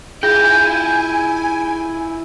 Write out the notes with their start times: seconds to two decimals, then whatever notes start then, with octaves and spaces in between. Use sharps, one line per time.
0.23 E4 F4 G#4 G5 G#5 A#6